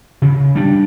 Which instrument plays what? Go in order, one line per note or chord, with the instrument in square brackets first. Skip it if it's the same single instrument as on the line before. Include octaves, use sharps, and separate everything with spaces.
[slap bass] C#3
G3 D4